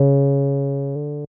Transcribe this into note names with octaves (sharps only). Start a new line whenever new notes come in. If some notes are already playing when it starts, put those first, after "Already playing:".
Already playing: C#3
D3